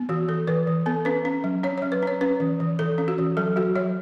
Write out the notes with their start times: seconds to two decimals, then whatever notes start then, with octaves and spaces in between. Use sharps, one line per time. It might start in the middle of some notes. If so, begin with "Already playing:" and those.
Already playing: B3
0.09 E3 F#4
0.28 E3 A4
0.47 E3 B4
0.67 E3
0.86 B3 A4
1.05 C#4 B4
1.25 C#4
1.44 F#3
1.63 C#4 C#5
1.78 F#3 C#5
1.92 B4
2.03 C#4 C#5
2.21 C#4 B4
2.40 E3
2.60 E3
2.79 E3 A4
2.98 C#4
3.08 F#4
3.18 E3
3.37 F#3 A4
3.56 F#3 F#4
3.75 F#3 C#5